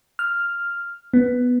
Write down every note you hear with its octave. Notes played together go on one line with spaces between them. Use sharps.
F6
B3